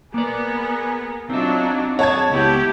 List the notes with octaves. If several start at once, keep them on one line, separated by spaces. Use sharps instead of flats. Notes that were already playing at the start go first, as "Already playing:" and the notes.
A#3 B3 G#4 A#4 D5
F#3 C4 D4 D#4 F4 F#4 E5
C4 G#4 C#5 F#5 A5 G#6
C#2 A3 B3 E4 G4